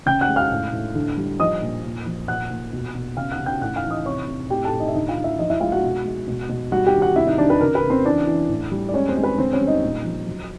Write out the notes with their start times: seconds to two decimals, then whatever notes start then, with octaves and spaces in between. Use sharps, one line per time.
0.06 C#3 G5 G6
0.21 F#5 F#6
0.28 G#3
0.36 F5 F6
0.51 A2
0.73 A2
0.95 D3
1.17 G3
1.40 F3 D#5 D#6
1.62 A#2
1.84 A#2
2.06 F3
2.28 A#2 F#5 F#6
2.51 A#2
2.73 B2
2.95 B2
3.17 C#3 F5 F6
3.32 F#5 F#6
3.39 C#3
3.46 G5 G6
3.61 A2 F#5 F#6
3.76 F5 F6
3.83 E3
3.91 D#5 D#6
4.06 C3 C#5 C#6
4.28 C3
4.50 A2 G4 G5
4.65 A4 A5
4.72 A2
4.80 D#4 D#5
4.88 E5
4.94 D3 D#4 D#5
5.09 F4 F5
5.17 D3
5.24 E4 E5
5.39 F3 D#4 D#5
5.50 E4 E5
5.61 G#3 F4 F5
5.72 F#4 F#5
5.83 B2
6.05 G#3
6.28 B2
6.49 B2
6.72 G3 F#4 F#5
6.86 G4 G5
6.94 D#3
7.01 F#4 F#5
7.16 C3 E4 E5
7.27 D#4 D#5
7.38 D#3 D4 D5
7.50 B4
7.61 C#3 A#4
7.75 B4
7.83 C#3
7.90 C4 C5
8.05 E3 D4 D5
8.27 E3
8.49 A2
8.71 G3
8.89 D5
8.94 G#3 C#4 C#5
9.09 C4 C5
9.16 G#3
9.23 B4
9.38 D3 C4 C5
9.53 C#4 C#5
9.60 G3
9.67 D#4 D#5
9.83 A#2
10.04 F3
10.27 F#3